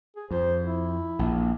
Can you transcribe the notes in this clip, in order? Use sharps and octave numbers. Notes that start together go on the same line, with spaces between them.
G#4
F2 C5
E4
A#1